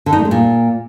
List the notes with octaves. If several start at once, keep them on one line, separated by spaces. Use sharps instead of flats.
D3
D#4
A3
G#3
A#2